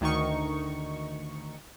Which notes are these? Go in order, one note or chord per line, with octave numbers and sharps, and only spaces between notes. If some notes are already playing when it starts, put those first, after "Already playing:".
D2 D#3 D#4 C#6